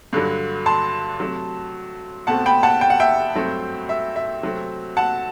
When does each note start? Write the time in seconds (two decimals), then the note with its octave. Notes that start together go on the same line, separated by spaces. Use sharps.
0.13 G2 D3 F#3
0.66 A5 C6
1.20 C3 F#3 A3
2.27 B2 A3 C4 F#5 A5
2.46 G5 B5
2.63 F#5 A5
2.81 G5
2.90 F#5
3.00 E5 G5
3.35 G2 F#3 A3 C4
3.89 E5
4.16 E5
4.43 C3 F#3 A3 C4
4.97 F#5 A5